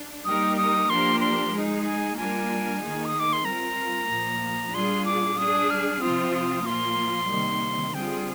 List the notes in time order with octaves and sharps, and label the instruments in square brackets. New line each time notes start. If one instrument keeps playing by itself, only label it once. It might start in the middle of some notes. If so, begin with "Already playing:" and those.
Already playing: [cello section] D4
[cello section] G3 A#3 D#4 G4 A#4 [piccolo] D#6
[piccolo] D#6
[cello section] F3 A#3 D4 G4 A#4 [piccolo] C6
[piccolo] C6
[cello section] G#3 D#4 G#4
[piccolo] G#5
[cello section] G3 A#3 D4 F4 A#4 [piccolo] G#5
[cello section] D#3 A#3 D#4 G#4
[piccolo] D#6
D6
C6
[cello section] G3 C4 F4 A#4 [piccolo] A#5
[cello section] A#2 F3 A#3
[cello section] A#2 G3 D4 F4 G#4 [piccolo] C6
[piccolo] D6
[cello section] G3 D4 G#4 [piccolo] D#6
[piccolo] F6
[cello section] C3 F3 C4 F4 [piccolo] D#6
[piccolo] D#6
[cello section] A#2 F3 A#3 F4 [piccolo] C6
[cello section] C3 D#3 G3 A#3
[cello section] D3 G3 C4 F4 G#4 [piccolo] G5